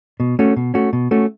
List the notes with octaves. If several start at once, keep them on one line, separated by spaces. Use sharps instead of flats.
B2
A3 C#4 F#4
B2
A3 C#4 F#4
B2
A3 C#4 F#4